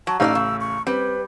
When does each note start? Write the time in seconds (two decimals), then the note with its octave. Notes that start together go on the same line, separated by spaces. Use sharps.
0.07 F#3 A5
0.20 A1 D#4 C#5 D5 F5 E6
0.35 C#3
0.60 C#6
0.87 G3 C4 B4